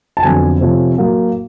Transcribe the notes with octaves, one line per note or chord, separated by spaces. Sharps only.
A5
F2 D3 F#3 B3 G#5
C3 F3 A3 C#4
A2 F#3 A#3